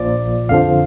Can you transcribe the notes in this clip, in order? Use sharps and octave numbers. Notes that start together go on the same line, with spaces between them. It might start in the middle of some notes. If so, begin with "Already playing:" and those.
Already playing: A#1 A#2 F3 D5
F2 D3 F3 F5